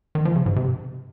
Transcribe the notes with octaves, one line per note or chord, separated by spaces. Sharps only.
D#3
F3
C#3
G#2
C3